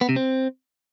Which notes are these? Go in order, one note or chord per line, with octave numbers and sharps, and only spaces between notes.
B3
C3
C4